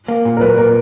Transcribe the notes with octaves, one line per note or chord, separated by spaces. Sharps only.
A#3
A#2
A#4
F#3 B4
A#2 A#4